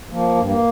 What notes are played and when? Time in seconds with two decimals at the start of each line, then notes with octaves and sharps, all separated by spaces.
0.11 F3 A#3
0.35 G2
0.46 A#3